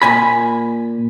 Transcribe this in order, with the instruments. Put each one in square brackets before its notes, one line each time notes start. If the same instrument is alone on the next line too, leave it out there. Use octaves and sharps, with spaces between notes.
[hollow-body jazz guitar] A#2 G#5 B5